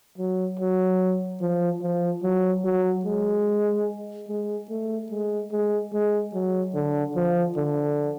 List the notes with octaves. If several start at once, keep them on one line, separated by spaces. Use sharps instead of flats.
F#3
F#3
F3
F3
F#3
F#3
G#3
G#3
A3
G#3
G#3
G#3
F#3
D3
F3
D3